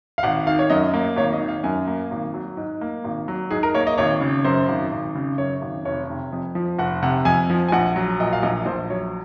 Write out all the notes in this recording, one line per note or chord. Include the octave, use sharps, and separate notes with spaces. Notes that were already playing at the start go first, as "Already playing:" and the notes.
F5
G#1 F#5
D#3 F5
C#5
F#2 D#5
A#3
G#1 C#5
D#5
D#3
F5
F#2 G#5
A#3
G#1
F#3
G#2
A#3
G#1
F#3
G#2 G#4
A#4
A#3 C#5
D#5
G#1 C#5
C#3
F#2 C5
G#1
G#1
C#3
F#2 C#5
G#1
F1 C#5
C3
F2
F3
F1 F#5
C3 F#5
F2 G#5
F3
G#5
A#1 F#5
F#3
A#2 D#5
F5
A#1 D#5
A#1 C5
F#3 C#5